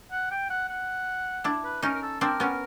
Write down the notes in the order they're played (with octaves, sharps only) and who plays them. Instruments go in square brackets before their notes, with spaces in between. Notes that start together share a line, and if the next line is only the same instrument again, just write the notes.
[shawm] F#5
G5
F#5
F#5
[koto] D4 E4
[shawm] B4
[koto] C#4 D#4 [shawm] A#4
[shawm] A#4
A4
[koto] C4 D4 [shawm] A#4
[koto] B3 C#4